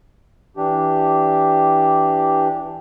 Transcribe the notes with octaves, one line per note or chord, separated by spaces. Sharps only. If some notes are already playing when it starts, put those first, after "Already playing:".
E3 D4 G4